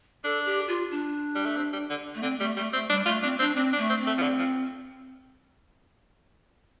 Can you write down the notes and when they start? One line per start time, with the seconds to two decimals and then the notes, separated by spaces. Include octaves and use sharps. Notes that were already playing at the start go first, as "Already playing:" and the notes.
0.24 D4 A4
0.45 G4
0.68 F4
0.91 D4
1.35 G3
1.46 A3
1.57 C4
1.73 G3
1.90 D3
2.15 A3
2.23 D3 C4
2.39 G3 A3
2.57 G3 A3
2.73 A3 C4
2.90 G3 D4
3.06 A3 F4
3.23 C4 D4
3.39 C4 D4
3.56 C4 D4
3.73 D4
3.78 A3
3.90 C4
4.00 C4
4.07 A3
4.18 F3
4.22 D3
4.39 F3